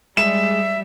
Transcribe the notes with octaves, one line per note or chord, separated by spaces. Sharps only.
G3 G#3 E5 E7